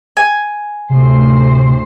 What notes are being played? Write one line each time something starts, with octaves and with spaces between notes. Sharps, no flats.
G#5
D2 A2 C3 C5